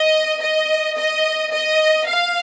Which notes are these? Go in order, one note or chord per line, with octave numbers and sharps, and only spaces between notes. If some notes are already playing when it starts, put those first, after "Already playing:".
Already playing: D#5
D#5
D#5
D#5
F5